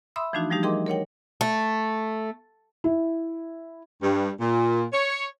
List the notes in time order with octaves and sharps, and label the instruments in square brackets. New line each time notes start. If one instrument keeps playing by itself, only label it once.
[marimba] E5 B5 C6 D#6 E6
E3 F3 A3 D4 D#4 F#4
F3 G3 A3 D#4 G4
G#4 A#4 D#5 G5 C6 D6
A#4 C#5 F#5 G5
[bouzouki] A3
[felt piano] E4
[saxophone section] G2
A#2
C#5